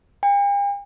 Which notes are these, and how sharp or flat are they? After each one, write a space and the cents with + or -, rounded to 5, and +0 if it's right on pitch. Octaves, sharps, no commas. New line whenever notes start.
G5 +45